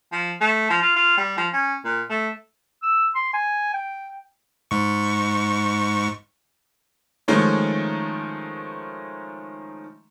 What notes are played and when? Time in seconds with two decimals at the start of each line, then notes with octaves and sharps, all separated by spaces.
0.12 F3
0.41 A3
0.70 F3
0.82 F4
0.96 F4
1.18 G3
1.37 F3
1.53 C#4
1.85 A#2
2.10 A3
2.83 E6
3.15 C6
3.34 G#5
3.74 G5
4.71 G#2 C#6
7.28 D#3 F3 G#3 A3 C#4 D#4